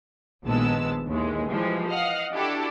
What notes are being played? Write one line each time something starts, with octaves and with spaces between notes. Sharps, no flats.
A#1 D#2 G#3 B3 A5 E6
D#2 E3 G#3
E3 F3 G3 G#3
D#5 F5 F#5 F6
D4 E4 F#4 G4 A4